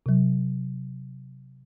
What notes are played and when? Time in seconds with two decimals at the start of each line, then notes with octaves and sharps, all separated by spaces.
0.06 C3 F#3